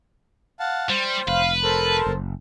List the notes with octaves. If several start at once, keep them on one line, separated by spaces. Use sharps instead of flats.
F5 F#5 A5
G3 C5
F1 B4 F5
A4 A#4 C5 A5
F#1